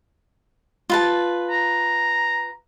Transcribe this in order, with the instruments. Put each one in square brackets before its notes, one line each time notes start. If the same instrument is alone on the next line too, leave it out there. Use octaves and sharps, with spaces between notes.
[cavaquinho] F4 B4 A5
[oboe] A#5